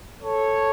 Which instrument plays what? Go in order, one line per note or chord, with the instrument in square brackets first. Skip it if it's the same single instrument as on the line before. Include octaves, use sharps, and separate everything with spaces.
[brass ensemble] A4 C#5